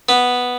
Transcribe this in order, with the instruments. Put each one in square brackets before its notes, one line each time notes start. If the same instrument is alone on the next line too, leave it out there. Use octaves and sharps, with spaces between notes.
[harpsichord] B3